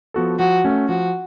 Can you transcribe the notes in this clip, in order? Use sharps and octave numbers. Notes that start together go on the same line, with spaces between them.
F3 B3 F#4 A4
F3 F#4
A3 C#4
F3 F#4